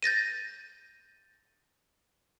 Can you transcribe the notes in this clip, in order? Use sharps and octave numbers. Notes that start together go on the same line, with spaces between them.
G6 A6 A#6 D#7